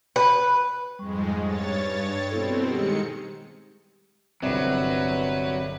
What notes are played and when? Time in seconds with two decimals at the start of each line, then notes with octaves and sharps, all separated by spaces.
0.16 B4
0.99 F2 G#2 G3 G#3 C#6
1.43 G2 C#5 A6
2.31 B2 B3 C4 E4 A4
2.69 D#3 G3 G#3 G4 G#4 C#7
4.42 G1 C2 F#3 C4 B4